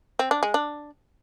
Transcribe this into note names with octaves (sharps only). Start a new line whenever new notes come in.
C4
D4
G#3
D4